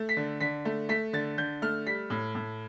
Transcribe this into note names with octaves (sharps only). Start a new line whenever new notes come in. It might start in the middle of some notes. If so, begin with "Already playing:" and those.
Already playing: A3
B6
D3
D3 B6
A3
A3 B6
D3 A6
D3 G6
A3 F6
G3 B6
A2
A2